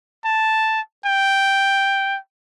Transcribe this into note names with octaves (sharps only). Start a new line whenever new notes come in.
A5
G5